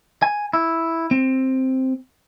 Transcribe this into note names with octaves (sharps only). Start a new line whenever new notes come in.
G#5
E4
C4